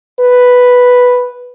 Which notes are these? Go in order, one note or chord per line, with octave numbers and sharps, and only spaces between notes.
B4